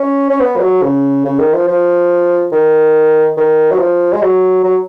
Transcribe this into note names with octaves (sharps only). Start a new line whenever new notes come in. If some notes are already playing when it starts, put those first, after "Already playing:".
Already playing: C#4
C#4
B3
F3
F#3
C#3
C#3
D#3
F3
F3
D#3
D#3
F#3
F3
G#3
F#3
F#3